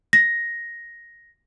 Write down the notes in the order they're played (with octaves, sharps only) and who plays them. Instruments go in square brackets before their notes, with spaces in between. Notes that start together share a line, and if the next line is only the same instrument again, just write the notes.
[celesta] A#6